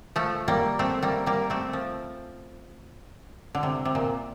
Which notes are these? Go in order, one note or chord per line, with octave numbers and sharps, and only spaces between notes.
F3 A3
G3 A#3
A3 C4
G3 A#3
G3 A#3
A3 C4
F3
D3
C3
C3
A#2